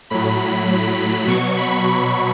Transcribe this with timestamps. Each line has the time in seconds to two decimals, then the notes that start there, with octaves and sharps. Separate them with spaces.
0.10 A2 F#3 B5
1.27 B2 F#3 C#6
1.57 B5
1.86 B5